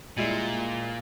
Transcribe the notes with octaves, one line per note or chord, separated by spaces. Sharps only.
A#2 G3 G#3 E4